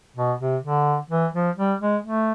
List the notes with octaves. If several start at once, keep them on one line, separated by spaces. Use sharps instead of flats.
B2
C3
D3
E3
F3
G3
G#3
A3